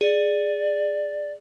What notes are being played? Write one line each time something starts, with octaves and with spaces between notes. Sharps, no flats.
G#4 D5